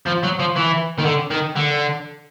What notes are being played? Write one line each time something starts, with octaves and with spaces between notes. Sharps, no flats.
F3
F#3
F3
E3
D#3
D3
D#3
D3